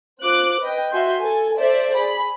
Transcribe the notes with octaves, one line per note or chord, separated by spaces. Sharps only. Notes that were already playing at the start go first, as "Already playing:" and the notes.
F4 C5 D6 F#6
B4 D#5 G5
F#4 E5 G#5 C6 G6
A4 G#5
A4 C5 D5 E5
G#4 B5